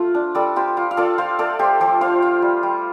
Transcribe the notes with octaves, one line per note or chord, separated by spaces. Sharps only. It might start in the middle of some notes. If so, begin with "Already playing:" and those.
Already playing: F3 A3 F4
D4
G3 A4 D5
F4 G4 C5
F4
F5
F4 A4 D5
F4 C5 F5
A3 A4 D5
A3 G4 C5
F3 G4 C5
F4 C5 F5
F4
G3
G3